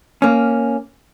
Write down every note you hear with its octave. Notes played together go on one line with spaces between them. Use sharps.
A#3 C#4